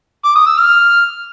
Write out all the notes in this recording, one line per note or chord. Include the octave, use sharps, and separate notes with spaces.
D6
D#6
E6
F6